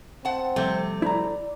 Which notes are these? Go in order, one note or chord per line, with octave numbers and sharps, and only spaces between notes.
C4 F#5 A5
C3 F3 G3 A3
E4 D5 A#5